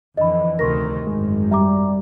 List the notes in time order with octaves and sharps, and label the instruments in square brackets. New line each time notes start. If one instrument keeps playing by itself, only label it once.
[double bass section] F2 D3 E3 [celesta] D#5 B5
[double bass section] D2 C3 D#3 [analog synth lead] A#4 [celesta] C6 C#6 A#6
[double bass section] G#1 F#2 [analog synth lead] G#3
[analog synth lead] G3 [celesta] E5 A#5 D6